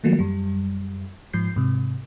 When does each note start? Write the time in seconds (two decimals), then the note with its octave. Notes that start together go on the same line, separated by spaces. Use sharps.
0.04 D#3 F3 F#3 A3 A#3
0.19 F#2 G3
1.33 G#2 F3 G6 C7
1.56 G#2 C3